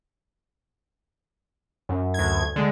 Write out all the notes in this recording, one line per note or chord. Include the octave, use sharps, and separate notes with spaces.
F#2
D2 G#6
D3 G#3